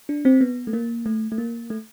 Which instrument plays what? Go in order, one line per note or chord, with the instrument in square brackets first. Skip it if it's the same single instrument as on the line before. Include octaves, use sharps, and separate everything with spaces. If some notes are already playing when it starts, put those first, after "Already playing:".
[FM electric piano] D4
C4
B3
A3
A#3
A3
A3
A#3
A3